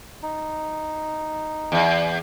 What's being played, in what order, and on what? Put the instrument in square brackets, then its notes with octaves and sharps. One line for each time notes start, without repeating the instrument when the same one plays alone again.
[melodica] D#4
[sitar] E2